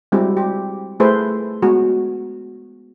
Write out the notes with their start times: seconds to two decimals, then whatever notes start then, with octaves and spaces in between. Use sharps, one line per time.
0.12 G3 G#3 C4 E4 F#4 G4
0.37 G4
1.00 A3 E4 G#4 A4 B4 C5
1.62 G#3 B3 F#4